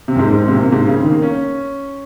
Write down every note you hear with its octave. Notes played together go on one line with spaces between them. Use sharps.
C3
F#2
G#2
G#2
G#2
C3
A#2
C3
G#2
A#2
C#3
D#3
A#3
C#4